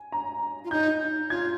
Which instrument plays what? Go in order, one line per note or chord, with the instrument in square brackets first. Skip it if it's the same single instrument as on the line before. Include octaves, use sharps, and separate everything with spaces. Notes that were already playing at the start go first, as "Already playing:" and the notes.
Already playing: [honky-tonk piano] G#5
A#5
[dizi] F4
[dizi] D#4 [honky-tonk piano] G6
[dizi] F4 [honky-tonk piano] G#6